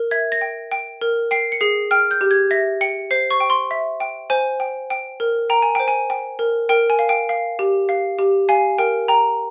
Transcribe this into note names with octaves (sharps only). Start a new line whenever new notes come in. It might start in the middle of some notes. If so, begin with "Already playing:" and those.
Already playing: A#4
E5 G#6
A#6
G5
G5
A#4
G5 C7
C#7
G#4 C7
G5 F6
G6
G4
G#6
E5 A#6
G5 C#7
C5 C7
C#6
G5
C6
E5
G5
C5 G#5
G5
G5
A#4
G5 A#5
G#5
C5 G5
G#5
G5
A#4
A#4 G5
G#5
F5
G5
F5
G4
F5
G4
F5 G#5
A#4 G5
G5 A#5